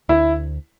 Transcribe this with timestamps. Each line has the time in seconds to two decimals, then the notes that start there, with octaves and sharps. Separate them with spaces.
0.09 D2 E4